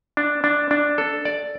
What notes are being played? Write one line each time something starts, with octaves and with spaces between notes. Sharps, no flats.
D4
D4
D4
A4
D5